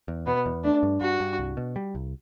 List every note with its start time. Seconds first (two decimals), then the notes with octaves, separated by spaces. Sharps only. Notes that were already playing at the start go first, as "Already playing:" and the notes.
0.08 E2
0.26 B2 B3
0.46 E2
0.64 A3 D4
0.83 G2
1.01 G2 F#4
1.20 G2
1.39 C2
1.57 B2
1.76 G3
1.95 C2